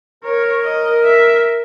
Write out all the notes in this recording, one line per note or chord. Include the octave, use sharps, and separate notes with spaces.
A#4 C#5
D#5
E5